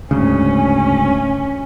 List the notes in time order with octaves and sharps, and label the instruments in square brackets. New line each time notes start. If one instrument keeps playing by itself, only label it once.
[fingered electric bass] D2 [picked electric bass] G#2 C#3 [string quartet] C#4